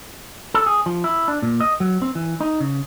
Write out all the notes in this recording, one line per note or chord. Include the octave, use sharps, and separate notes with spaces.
A4
G#4
F3
E4
D4
A#2
D#5
F#3
C4
E3
D#4
C#3